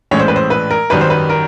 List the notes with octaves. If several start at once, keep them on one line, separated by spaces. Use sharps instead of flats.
A#1 A2 E3 G#3 C#4 C#5
C5
B4
C5
B4
A#4
G#1 F#2 D#3 G3 B4
C5
B4
A#4